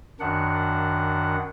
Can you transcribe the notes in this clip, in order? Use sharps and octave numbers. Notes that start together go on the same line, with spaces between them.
F#2 D#3 D4 F#5